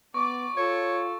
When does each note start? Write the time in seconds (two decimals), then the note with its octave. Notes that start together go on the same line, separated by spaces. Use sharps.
0.14 B3 D5 C#6 D6
0.57 F4 A4 C#5